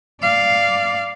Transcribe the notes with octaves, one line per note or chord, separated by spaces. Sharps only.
D5 F5